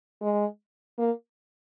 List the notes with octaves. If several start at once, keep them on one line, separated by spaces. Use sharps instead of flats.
G#3
A#3